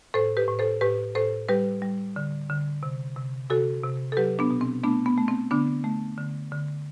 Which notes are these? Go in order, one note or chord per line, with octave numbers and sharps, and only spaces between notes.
A2 A4 C5
G4 B4
A2
A4 C5
A2 G4 B4
A2 A4 C5
G3 G4 B4
G3
D3
D3
C3
C3
C3 F#4 A4
C3
A4
F#3 G4 B4
B3 D4
B2
C4
A3 B3 D4
B3
A3
C4
D3 B3 D4
A3
D3
D3